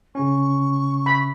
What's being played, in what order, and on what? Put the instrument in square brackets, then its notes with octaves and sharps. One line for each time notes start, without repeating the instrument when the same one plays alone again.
[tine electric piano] C#3 C#4 [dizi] C#6
[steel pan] B5